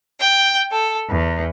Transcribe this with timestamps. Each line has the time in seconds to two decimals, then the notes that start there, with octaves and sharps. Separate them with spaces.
0.19 G5
0.71 A4
1.09 E2